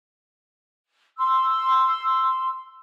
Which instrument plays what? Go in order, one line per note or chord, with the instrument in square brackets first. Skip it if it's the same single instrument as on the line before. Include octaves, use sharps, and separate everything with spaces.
[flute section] C6 E6